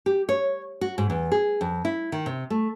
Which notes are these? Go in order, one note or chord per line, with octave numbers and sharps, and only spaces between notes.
G4
C#5
F#4
G#2
E2
G#4
F2
E4
D#3
C3
A3